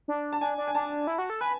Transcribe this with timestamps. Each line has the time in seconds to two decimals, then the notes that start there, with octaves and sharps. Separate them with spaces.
0.08 D4
0.33 A5
0.41 D4 G#5
0.58 D4
0.68 G#5
0.75 D4 A5
1.07 E4
1.18 F#4
1.30 A4
1.41 B4 G#5